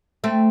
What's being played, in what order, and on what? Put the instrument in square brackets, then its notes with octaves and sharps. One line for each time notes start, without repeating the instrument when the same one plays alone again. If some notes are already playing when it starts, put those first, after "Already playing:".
[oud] A3 C4